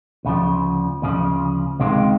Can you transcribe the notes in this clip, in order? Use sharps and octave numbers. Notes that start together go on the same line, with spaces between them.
D2 C#3 F3
D2 C#3 F3
C#2 C3 D#3 G#3 C4